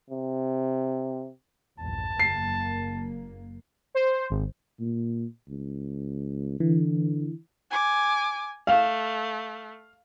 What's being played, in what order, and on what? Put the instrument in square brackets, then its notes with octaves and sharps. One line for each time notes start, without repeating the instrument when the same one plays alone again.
[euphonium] C3
[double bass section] A#1 E2 G2 [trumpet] A5
[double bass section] F#1 A#3 [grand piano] C7
[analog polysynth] C5
G#1
[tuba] A#2
C#2
[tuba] D3 [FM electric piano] E3
[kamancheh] G#5 D6
[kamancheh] A3 [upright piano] F5